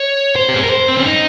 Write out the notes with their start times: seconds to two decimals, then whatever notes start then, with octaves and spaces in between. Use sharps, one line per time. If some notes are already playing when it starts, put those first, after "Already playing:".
Already playing: C#5
0.36 C5
0.49 G4
0.56 G#4
0.63 A#4
0.70 C5
0.88 C4
0.97 C#4
1.05 D#4